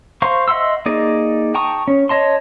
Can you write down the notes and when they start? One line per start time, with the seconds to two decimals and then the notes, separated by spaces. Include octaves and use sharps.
0.22 C5 F5 A#5 C6 C#6
0.48 D#5 E5 F#5 C6 E6
0.86 A#3 D#4 G#4 D5 D#5
1.55 G5 A5 A#5 C#6 D#6
1.88 C#4
2.09 C#5 D#5 A5 C6